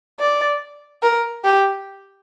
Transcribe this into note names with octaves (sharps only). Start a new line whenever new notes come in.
D5
A#4
G4